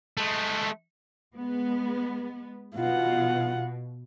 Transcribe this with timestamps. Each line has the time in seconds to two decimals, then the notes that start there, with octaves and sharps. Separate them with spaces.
0.17 G#3 A3
1.36 G#3 B3
2.75 B2 F4 F#5